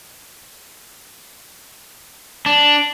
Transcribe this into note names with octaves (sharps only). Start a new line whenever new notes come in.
D4